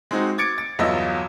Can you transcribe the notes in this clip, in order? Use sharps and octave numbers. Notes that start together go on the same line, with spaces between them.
G#3 C4 D#4 F#4
D6 G#6 A6 C#7 D7
A6
G1 E2 F#3 F4 D#5 E6